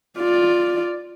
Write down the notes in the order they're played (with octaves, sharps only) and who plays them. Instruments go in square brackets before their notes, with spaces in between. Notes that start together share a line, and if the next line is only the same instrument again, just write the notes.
[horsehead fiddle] F4 D5